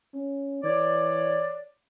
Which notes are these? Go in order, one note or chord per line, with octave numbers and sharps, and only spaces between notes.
C#4
E3 C#5 D5